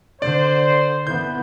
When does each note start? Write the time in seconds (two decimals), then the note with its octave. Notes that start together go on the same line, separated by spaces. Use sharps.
0.22 D3 C5 D5
1.07 E3 B3 G6